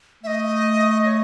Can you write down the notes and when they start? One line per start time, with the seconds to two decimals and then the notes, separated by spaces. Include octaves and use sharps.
0.23 A3 E5
0.27 D#5
1.05 C#5